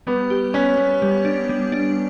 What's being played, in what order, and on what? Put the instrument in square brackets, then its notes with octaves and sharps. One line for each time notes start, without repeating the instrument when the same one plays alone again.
[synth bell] G3 [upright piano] B3
[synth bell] G4
[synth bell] B3 [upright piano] C#4
[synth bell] B3
G3
D4
G3
D4